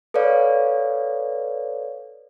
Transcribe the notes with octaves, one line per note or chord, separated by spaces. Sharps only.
A4 B4 C#5 D5 F5